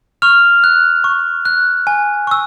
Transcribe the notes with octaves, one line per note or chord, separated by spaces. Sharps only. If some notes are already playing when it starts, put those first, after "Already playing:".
C#6 F6 F7
F#6
C#6
F#6
G#5
C#6 E6